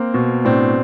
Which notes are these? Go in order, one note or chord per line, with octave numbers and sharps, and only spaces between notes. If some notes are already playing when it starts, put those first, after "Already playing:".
Already playing: A#3 C4
B2
A2 C4 D4